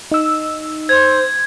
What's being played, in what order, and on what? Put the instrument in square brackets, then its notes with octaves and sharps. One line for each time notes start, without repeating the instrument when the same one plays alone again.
[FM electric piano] D#4 E6
[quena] C5 [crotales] G#6